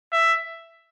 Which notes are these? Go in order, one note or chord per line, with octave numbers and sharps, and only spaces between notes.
E5